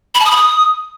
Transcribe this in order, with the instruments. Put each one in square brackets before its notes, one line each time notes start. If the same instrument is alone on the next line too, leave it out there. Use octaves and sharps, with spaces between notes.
[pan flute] B5
A5
D#6
B5
D#6